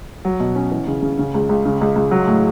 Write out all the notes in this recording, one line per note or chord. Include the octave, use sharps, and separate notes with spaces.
F#3
B2
C#4
E3
C#3
C#3
C#3
C#2
C#2
C#3
C#2
C#2
F#3
A2